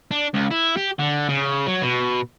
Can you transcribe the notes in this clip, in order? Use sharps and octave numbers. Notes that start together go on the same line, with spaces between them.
D4
C#2
E4
G4
D3
C#3
F#3
B2